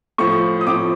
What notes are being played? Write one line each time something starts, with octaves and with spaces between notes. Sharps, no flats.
A2 F3 C#6
D#6
A2 F3 D6